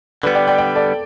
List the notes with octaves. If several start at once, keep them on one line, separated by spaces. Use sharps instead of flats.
D3 G3 B3 B4
D5 G5
D5 G5
D5 G5
A4 D5